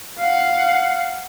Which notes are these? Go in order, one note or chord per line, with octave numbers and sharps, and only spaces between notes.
F5 F#5